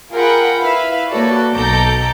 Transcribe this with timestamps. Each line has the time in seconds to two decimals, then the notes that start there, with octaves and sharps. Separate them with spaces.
0.14 F4 G#4 A#4 F#5 G5 B5
0.60 E4 B4 E5 F5 B5
1.10 A#3 F#4 A4 B4 C#5 D5
1.53 B1 B2 A4 A#5 D6 G6